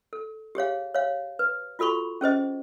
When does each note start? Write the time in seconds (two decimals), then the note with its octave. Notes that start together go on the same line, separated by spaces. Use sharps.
0.13 A4
0.55 G4 G#4 C#5 F5
0.95 C#5 F5
1.39 B4
1.79 F4 F#4 A4 B5 C#6
2.21 C#4 G#4 C5 D#5